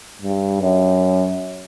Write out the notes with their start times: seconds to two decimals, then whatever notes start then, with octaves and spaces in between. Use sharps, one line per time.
0.22 G2
0.61 F#2